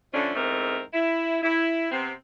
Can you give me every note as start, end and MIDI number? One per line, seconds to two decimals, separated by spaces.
0.14 0.32 50
0.14 0.32 53
0.14 0.32 57
0.14 0.32 61
0.14 0.32 62
0.35 0.81 40
0.35 0.81 44
0.35 0.81 57
0.35 0.81 60
0.35 0.81 70
0.93 1.38 64
1.42 1.90 64
1.91 2.12 48
1.91 2.12 59
1.91 2.12 60